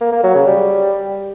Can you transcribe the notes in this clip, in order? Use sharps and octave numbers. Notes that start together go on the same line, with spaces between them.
A#3
A#3
F#3
C#3
G3